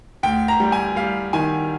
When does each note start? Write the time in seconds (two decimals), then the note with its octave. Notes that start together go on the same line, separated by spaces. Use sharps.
0.23 D2 G5
0.48 A#5
0.60 G3
0.72 G#5
0.96 G3 F5
1.33 D#3 G#5